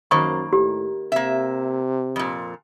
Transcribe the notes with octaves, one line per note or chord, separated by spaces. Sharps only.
F#2 D#3 A#3 C5 B5 C#6
A2 G4
C3 A#3 E5
F2 A#2